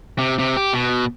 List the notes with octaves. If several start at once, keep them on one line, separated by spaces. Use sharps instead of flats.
C3
C3
G4
B2